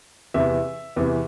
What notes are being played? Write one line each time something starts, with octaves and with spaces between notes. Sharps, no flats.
E2 C3 E3 E5
E2 C3 E3